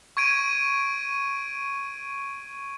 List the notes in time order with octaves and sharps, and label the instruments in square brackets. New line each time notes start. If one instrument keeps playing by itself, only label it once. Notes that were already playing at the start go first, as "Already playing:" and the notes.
[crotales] C#6 G#6 D7 D#7